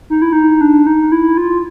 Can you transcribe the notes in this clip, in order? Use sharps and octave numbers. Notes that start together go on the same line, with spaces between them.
D#4
E4
D#4
D4
D#4
E4
F4